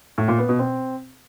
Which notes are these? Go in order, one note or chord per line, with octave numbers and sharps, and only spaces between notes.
A2
A#2
B3
B2
C4